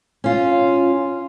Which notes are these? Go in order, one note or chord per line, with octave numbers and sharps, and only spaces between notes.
C#4 F4